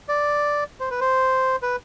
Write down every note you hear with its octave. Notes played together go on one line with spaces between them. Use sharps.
D5
C5
B4
C5
B4